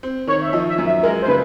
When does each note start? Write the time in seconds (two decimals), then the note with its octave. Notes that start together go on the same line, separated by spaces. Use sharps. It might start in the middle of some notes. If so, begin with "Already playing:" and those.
0.03 C4
0.27 D#3 C#5
0.41 E5
0.53 F3 D#5
0.69 E5
0.78 F#2
0.86 E5
1.03 G#3 A#4
1.22 C5
1.28 C#3 B4